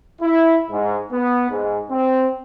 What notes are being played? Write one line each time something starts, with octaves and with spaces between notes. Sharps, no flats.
E4
G#2
B3
G#2
C4